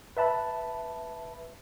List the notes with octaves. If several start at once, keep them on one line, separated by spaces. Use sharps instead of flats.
B4 E5 A5 B5